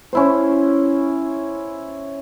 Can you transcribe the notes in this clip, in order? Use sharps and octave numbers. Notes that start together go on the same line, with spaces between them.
C#4 E4 C5